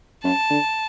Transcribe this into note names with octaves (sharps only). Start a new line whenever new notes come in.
F#2 A5
D3